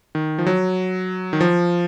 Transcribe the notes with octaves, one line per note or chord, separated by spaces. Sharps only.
D#3
F3
F#3
D#3
F3